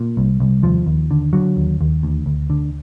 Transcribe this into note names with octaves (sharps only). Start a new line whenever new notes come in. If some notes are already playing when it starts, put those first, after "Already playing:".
Already playing: A#2
C2
C2
D#2 F3
D#2
D3
D3 F#3
D#2
D#2
D2
D2
D3